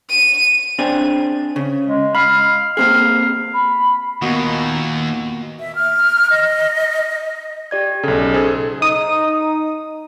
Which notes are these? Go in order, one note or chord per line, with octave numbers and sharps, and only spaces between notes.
D#7
C4 D4 G#4
C#3
G#3
F5 B5
A#3 C4 G#4 F5
B5
D#2 A#2 B3 F#4 D#5
E5
F6
D#5
G4 D5 G#6
B1 C#3 A4
G#4 A4 C5
D#4 D#6